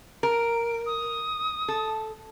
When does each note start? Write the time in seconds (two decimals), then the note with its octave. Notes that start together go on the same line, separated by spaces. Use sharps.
0.23 A#4 D7
0.86 D#6
1.68 A4